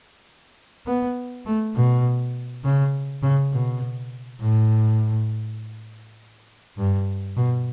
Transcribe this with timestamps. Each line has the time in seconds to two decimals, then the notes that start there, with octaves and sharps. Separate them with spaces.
0.87 B3
1.46 A3
1.76 B2
2.64 C#3
3.23 C#3
3.53 B2
4.41 A2
6.78 G2
7.37 B2